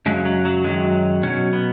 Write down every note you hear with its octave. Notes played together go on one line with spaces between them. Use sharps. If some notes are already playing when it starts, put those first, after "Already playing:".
F#2 C#3 F#3 G#3
F#3
F#3
F#2 D#3 F#3 G#3
B2 F#3 C#4
B3